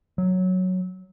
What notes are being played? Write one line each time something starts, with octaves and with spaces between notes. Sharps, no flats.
F#3